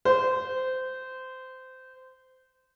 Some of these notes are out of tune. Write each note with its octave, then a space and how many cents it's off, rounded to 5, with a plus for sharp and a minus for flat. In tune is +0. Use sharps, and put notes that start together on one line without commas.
C5 -20